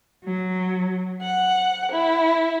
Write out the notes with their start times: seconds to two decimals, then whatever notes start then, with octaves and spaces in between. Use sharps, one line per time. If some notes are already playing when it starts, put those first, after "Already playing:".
0.25 F#3
1.22 F#5
1.92 E4